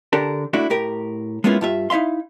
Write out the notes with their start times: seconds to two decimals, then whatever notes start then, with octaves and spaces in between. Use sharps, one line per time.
0.13 D3 D4 G4 A4 A#4
0.53 A3 D4 E4 F#4
0.70 A2 G4 A#4
1.44 G#3 A#3 B3 C#4 E4 F4
1.61 G2 F4 E5
1.90 D#4 E4 E5 F5 C6